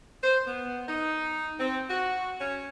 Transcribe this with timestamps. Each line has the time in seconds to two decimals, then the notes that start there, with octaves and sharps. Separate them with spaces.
0.23 C5
0.46 B3
0.88 D#4
1.59 C4
1.90 F#4
2.40 C#4